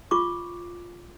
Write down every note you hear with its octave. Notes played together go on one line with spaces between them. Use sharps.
F4 C#6 D6